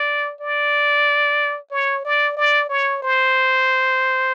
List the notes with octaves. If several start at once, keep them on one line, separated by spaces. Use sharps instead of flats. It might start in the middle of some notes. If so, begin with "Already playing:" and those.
Already playing: D5
D5
C#5
D5
D5
C#5
C5